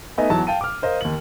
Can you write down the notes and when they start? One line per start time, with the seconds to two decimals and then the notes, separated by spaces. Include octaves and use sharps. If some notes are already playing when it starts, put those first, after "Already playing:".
0.18 A3 B3 D#4 D#5 E5 G#5
0.30 E2 E3 F#3 A5
0.47 F5 G5 A5 D#7
0.61 D6 F6
0.82 A#4 C5 D#5 F5
1.01 D#2 F#7